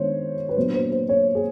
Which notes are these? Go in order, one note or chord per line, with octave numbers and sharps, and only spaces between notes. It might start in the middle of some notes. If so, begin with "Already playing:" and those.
Already playing: D#3 G#3 B3 D4 C5 C#5
B4
A#2 F#3 B3 D4 C5
C5
C5
C#5
G#4